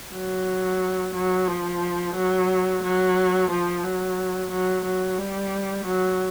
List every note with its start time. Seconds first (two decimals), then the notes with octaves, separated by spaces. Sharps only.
0.12 F#3
1.14 F#3
1.47 F3
2.15 F#3
2.83 F#3
3.50 F3
3.83 F#3
4.51 F#3
4.84 F#3
5.18 G3
5.85 F#3